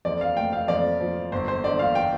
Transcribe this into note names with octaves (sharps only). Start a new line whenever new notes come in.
F2 D5
F5
A3 G5
F5
F2 D5
F3
G1 C5
C5
D3 D5
F5
G5